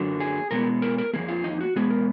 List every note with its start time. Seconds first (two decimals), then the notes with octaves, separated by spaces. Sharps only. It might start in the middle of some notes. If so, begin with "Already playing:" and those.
Already playing: F#2 D3 F#3 A#3
0.20 G#4
0.51 B2 G#3 B3 A#4
0.82 A#4
0.98 A#4
1.13 F2 D#3 A#3 G#4
1.28 F4
1.44 D#4
1.61 F#4
1.76 B2 G#3 B3 G#4
1.90 A#4